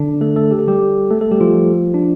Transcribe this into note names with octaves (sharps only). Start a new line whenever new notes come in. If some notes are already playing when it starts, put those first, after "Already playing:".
Already playing: D3 D4
A3 A4
A3 A4
G4
A4
G3 G4
A3 A4
A3 A4
G3 G4
F3 F4
D4